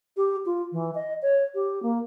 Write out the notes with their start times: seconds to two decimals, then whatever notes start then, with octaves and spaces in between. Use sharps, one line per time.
0.17 G4
0.46 F4
0.72 E3
0.95 D#5
1.22 C#5
1.55 G4
1.83 A#3